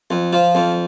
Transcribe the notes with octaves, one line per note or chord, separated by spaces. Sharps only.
F2
F3
F2